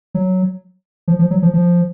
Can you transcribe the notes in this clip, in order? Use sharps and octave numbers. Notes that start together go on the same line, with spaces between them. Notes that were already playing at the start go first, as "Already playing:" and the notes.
F#3
F3
F3
F#3
F3
F3